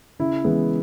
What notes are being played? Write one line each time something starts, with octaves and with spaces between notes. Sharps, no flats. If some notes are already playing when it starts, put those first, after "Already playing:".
C#3 E4
E3 G#3 B3